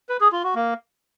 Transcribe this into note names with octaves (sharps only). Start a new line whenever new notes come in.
B4
G#4
F4
F#4
A#3